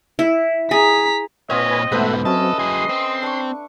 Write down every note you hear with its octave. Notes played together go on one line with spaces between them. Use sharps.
E4
G#4 A#5 B6
A#2 C4 F4 B4 C#5 D#5 G#5
G#2 B2 A3 A4 B4 C5 E5 F#5
F#3 C4 C#4 A4 D#5 E5
F#3 G#4 C6
C4
D4 C#6